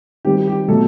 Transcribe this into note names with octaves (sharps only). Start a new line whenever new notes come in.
D#3 G3 C4 G4
G4
B2 F#3 A3 A4